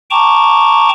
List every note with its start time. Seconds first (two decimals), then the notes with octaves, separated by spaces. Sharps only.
0.11 G5 A5 A#5 C#6 D6